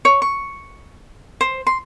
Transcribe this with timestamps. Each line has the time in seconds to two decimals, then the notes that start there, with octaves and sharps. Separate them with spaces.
0.05 C#5
0.22 C#6
1.41 C5
1.67 C6